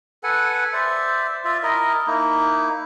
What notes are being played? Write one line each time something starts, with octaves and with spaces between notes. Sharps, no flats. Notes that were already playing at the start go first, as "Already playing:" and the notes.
A4 B4 F#5 G#5
C5 D5 E5
F4 D5 E5
E4 A#4 D#5
A#3 D#4 E4